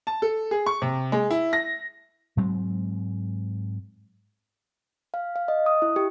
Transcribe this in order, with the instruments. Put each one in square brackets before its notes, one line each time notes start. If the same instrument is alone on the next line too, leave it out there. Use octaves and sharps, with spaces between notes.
[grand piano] A5
A4
G#4
C#6
C3
G#3
E4
A#6
[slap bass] G#2 F#3 G#3 C4
[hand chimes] F5
F5
D#5
D#6
E4
G4